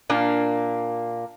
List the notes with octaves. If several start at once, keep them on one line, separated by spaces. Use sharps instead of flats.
A#2 A#3 D4